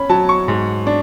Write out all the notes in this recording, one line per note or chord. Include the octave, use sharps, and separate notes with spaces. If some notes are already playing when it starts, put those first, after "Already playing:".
Already playing: C#4 B5
F#3 A5
C#6
G#2
D4